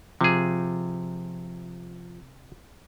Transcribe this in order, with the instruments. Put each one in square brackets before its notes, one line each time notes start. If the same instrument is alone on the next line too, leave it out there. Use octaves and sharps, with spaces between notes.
[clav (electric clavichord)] C3 G#4 [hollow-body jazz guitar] F3